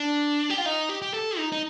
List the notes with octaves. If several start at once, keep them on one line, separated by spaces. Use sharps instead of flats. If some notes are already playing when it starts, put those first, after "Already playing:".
Already playing: D4
G4
F4
D#4
G4
G4
A4
D#4
D#4